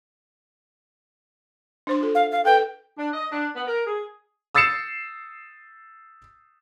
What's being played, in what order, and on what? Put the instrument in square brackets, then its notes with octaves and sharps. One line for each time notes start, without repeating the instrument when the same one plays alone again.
[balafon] D4 C5 C6
F4 A4
[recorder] F5
F5
[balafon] A4 B4 [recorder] G5
[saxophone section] D4
D#5
D4
B3
A#4
G#4
[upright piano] D#6 E6 A6 C7 C#7 E7